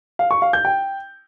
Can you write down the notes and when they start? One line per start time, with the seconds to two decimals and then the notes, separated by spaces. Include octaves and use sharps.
0.19 F5
0.31 C#6
0.42 F5
0.53 G6
0.65 G5